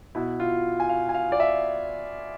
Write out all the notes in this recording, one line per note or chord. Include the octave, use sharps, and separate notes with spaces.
B2 E4
F4
G#5
F5
G#5
F5
D5
E5